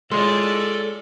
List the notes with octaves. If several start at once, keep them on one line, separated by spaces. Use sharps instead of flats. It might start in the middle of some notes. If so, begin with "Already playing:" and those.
G#3 F4 A4 C#5 D5 C6